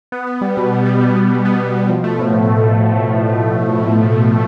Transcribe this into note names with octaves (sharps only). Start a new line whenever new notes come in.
B3
B3
G3
B2
G3
G3
G3
B3
B3
B3
B2
B2
F3
A3
A2